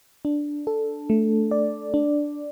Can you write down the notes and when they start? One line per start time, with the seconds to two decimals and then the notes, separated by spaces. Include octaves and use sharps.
0.25 D4
0.67 A4
1.10 A3
1.51 D5
1.94 D4